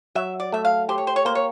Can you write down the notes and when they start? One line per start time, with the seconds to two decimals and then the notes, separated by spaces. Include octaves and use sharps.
0.15 F#3 E5
0.40 D5
0.52 A3 E5
0.65 F5
0.89 G4 C5
0.98 C#5
1.07 C5
1.16 C#5
1.25 A#3 C5
1.35 C#5